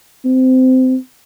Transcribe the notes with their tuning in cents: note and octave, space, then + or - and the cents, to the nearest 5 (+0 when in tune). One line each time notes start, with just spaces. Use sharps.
C4 -20